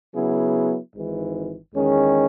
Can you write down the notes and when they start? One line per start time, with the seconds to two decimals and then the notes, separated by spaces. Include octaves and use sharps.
0.15 C#3 F#3 B3 E4 G#4
0.94 G#1 G#2 E3
1.73 E2 D#3 G#3 C#4 G#4